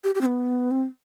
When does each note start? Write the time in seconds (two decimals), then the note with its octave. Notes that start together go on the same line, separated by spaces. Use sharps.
0.04 G4
0.15 G4
0.21 C4
0.26 B3
0.71 C4